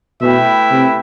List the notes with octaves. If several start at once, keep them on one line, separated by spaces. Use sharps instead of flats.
B2 A3 E4 B4 E5 G5
C3